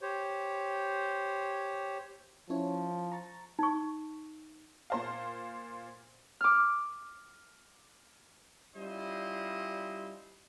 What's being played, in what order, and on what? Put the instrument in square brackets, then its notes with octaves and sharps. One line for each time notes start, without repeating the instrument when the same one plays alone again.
[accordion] G4 C5 C#5
[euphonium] F3 [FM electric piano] C#4 E4 C#5
[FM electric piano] A#5 C#6 A6
[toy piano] D#4 C#6
[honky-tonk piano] A#2 C5 F5
[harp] D6 F6
[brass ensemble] G3 C#4 E4 F4 C5 D#5